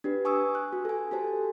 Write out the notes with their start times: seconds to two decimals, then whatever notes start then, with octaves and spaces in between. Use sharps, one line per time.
0.04 D4 G4 B4
0.25 G#5 C#6 D#6 E6
0.55 F#6
0.73 F#4
0.85 A4 G#5
1.11 F#4 G4 A4 C5 A5